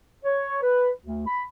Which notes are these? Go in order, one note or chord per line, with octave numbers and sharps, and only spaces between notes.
C#5
B4
D2
B5